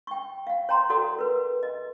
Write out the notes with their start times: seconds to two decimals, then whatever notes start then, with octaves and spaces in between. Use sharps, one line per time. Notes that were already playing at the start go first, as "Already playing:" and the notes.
0.07 G5 C#6
0.47 F5 F#5
0.69 C#5 G5 A#5 C6
0.90 F#4 A4 D5 F#5 C6 D#6
1.19 A#4 B4
1.63 D#5